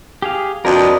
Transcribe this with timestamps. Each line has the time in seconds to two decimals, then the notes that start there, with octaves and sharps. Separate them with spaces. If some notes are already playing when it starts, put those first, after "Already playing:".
0.22 G4 G#4 F5
0.65 F2 D4 F#4 A#4 B4 D#5